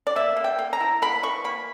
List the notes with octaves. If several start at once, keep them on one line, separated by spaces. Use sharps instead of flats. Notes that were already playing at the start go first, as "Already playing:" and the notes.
D5
A#3 E5
A#3
G5
A#3
A#5
E4
A#3 B5
E3 C#6
A#3 B5